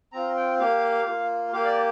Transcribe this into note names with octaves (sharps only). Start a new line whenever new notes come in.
C4 F4 A#5
G5
A#3 G4 F5
A#3 F4
A#3 G4 F5
D5